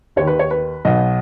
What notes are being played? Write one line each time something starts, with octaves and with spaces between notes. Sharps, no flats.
D#2 D#3 C#5
B4
C#5
B4
B1 B2 D#5